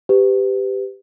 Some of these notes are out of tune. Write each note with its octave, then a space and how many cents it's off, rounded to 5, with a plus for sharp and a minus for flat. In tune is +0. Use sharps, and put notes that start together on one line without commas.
G4 +0 B4 +30